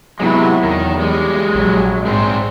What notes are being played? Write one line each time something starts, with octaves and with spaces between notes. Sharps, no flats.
C3 F#3 G#3 B3 E4
E2 D#3
G3 G#3
A#1 F#3
G#2 G#3 C4 C5